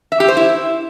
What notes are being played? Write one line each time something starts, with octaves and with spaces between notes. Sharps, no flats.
E5
G4
C5
E4